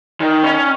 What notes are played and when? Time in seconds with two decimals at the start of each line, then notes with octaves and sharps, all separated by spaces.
0.21 D#3
0.43 C#4